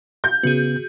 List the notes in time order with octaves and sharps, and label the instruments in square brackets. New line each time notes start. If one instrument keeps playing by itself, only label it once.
[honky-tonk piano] G6
[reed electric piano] C#3 B3 [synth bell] F#4 G#4